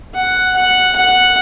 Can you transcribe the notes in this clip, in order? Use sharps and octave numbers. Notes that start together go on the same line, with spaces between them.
F#5
F#5
F#5